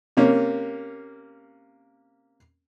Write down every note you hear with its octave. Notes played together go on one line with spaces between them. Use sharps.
C3 A#3 C#4